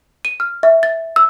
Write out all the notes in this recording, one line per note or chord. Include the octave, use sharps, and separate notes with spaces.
D#7
F6
E5
A6
E6